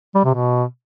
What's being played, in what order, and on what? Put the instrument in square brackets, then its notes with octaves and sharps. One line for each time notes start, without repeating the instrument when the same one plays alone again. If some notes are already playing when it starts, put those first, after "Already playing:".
[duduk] G3
C3
B2